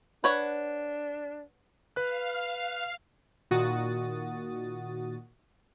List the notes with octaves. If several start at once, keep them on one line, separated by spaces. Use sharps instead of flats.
D4 B4 C#5 F#5
B4 F5 F#6
A#2 D#3 F#4 D#6 A6